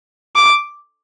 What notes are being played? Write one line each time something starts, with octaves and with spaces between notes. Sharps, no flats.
D6